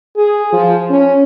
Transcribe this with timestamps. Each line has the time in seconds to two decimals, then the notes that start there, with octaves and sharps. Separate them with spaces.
0.16 G#4
0.53 F3
0.90 C#4